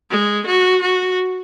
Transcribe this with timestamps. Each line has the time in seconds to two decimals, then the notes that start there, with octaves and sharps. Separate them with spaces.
0.11 G#3
0.46 F#4
0.82 F#4